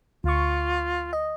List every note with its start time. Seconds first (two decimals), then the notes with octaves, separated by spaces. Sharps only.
0.24 D2 F4 C#6
1.13 D#5